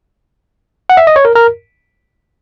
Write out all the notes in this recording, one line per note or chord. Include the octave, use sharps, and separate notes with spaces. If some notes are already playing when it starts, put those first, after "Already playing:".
F#5
E5
D#5
C#5
A#4
A#4